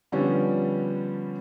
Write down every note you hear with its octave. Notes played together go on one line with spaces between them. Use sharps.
D3 F3 G3 B3 C#4 D4